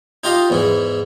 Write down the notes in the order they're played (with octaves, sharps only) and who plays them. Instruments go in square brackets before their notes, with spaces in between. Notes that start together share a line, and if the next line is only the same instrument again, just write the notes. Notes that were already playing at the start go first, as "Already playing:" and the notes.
[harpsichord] D#4 F4 G4 D#5 F5
E2 G#2 E3